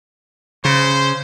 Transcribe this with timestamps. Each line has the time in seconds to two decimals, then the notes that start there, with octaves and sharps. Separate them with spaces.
0.65 C#3 C5